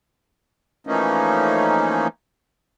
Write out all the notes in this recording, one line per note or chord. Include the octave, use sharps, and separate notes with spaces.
E3 F3 A3 A#3 C#4 D#4